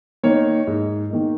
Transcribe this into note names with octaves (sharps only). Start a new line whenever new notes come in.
D#3 A#3 D#4 C#5
G#2
D#3 A#3 D#4